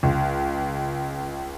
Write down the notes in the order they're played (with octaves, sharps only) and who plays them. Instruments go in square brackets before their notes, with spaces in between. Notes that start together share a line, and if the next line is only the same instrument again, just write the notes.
[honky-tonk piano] C#2